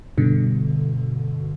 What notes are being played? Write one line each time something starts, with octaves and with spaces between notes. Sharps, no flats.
G2 B2 D3